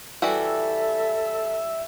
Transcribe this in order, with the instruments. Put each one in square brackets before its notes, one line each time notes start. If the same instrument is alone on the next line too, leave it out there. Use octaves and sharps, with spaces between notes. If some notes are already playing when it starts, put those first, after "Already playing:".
[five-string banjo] E3 G3 F#4 [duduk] A4 [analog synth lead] E5